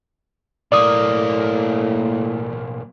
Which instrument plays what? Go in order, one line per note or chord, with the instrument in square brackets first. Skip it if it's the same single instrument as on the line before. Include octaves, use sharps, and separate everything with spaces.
[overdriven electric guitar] B1 A#3 [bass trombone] A2 [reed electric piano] D5 D#6